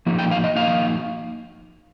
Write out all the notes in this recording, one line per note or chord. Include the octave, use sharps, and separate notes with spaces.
F3 A#3 D#4
G5
F5
D#5
F3 A#3 D#4 F5